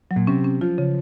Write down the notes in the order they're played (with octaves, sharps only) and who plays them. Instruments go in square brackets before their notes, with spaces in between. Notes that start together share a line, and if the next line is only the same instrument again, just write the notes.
[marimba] F#3
[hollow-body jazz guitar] A#2
[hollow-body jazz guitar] C3 [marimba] C#4
[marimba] C#4
[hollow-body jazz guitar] F3 [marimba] F4
[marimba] C#3